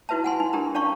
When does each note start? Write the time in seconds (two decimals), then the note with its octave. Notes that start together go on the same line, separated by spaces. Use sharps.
0.09 D#4 E4 F#4 B4 E5 A5
0.24 F#5 G#5 C6
0.40 D#4
0.53 D4 G4 A#4 A#5
0.75 C#4 D5 F5 A5 C#6